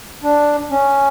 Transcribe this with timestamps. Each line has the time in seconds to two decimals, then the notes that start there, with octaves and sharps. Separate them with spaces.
0.23 D4
0.71 C#4